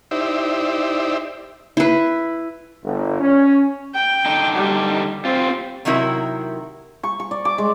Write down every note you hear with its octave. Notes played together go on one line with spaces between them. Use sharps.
D#4 E4 G4 C5 D5 E5
E4 B4
G1
C#4
G5
D3 D4 D#4
G3
C4 F4 G4
C3 D#3 F#3 E4 A#4
C#6
C#6
D5
D6
G#3